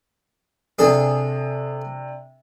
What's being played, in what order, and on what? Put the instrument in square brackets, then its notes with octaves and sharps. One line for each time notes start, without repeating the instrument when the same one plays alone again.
[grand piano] C3 D4 [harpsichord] G#4 A4